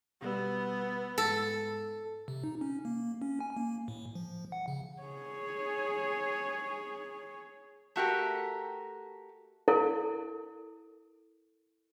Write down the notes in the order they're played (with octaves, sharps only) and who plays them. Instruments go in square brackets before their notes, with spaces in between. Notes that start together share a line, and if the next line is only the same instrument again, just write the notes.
[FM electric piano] B2 G3 E6 [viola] B3
[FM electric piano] G#2 [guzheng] A4
[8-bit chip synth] C3
D#4
C#4
A#3
C#4
G#5
A#3
A2
F3
F#5
C#3
[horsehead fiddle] G#4 C#5
[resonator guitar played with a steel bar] A3 F#4 G4 A#4
[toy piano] E4 A4 A#4